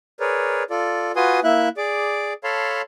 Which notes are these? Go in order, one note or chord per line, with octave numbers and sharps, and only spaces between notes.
G#4 A#4 B4 C#5 D5
F4 A4 D5
F4 F#4 B4 G#5 C6 D#6
A#3 E4 E5 F#6
G#4 D5 D6
A4 C#5 F5 A5 B5 C6